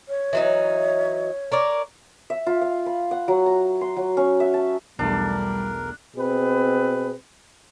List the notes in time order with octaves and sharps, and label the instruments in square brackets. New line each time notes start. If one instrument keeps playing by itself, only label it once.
[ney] C#5
[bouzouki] E3 F#3 D#4
A#4 C#5 D5
[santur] E5
F4
F5
B5
F#5
F#3
A#5
C6
F#3
C#4
E5
A5
[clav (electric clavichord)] B1 E2 A3 [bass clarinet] G3 [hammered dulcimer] D4 [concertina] A#4
[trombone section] B2 C4 G#4 B4